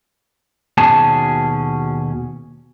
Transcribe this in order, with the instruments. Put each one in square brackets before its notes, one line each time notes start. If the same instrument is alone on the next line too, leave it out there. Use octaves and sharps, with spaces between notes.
[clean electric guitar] D#2 B2 C#4 G#4 A5